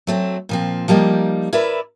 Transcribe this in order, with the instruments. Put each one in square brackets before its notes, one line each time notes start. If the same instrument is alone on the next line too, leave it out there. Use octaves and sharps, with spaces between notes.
[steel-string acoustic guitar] F#3 A3 C4
A#2 F3 C4
F3 G3 A#3 D#4
E4 A#4 B4 D5 E5